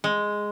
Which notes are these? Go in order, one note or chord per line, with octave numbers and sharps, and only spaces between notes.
G#3